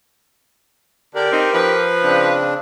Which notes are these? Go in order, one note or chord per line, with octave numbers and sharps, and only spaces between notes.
D3 D4 G4 A#4 D5
C4 D#4
F3 B4
C#3 C4 D4